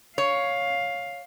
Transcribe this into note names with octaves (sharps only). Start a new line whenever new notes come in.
C#5 F5